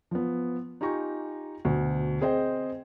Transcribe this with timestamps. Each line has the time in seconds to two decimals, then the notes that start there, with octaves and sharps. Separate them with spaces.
0.11 F3 B3
0.81 D#4 F4 G4 G#5 A#5 C#6
1.65 D2 B2
2.21 C4 G#4 C5 D#5 G5